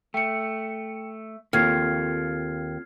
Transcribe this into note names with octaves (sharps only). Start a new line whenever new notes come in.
A3 G5 C#7
D#2 C4 F4 A4 F6 G#6 C7